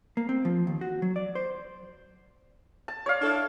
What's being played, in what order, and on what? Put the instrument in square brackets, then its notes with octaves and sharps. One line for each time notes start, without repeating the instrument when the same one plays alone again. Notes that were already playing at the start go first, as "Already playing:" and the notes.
[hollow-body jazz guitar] A#3
C4
F3
D#2
F#4
F#3
D5
C5
[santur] A5
C#5 D5 F5
[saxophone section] D4 E4 A4